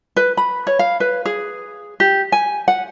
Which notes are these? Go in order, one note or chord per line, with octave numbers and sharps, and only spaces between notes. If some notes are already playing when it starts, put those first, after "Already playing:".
B4
B5
C#5
F5
B4
G#4
G4
G#5
F#5